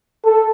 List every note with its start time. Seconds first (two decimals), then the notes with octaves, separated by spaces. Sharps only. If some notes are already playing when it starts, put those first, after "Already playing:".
0.25 A4